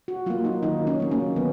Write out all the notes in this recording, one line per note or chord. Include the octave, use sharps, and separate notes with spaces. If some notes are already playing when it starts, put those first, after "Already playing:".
F#4
F#3 A#3 F4
D#4
D#3 D#4
C#4
F#3 A#3
C#4
D#3 B3